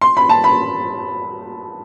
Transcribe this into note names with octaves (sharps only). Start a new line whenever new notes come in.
C6
B5
A5
B5